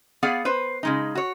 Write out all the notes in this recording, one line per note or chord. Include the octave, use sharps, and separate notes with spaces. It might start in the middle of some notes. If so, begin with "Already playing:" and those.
B3 G#4 D5 F5 F#5
B4 C5
C#3 G#3 D#4
F#4 C#5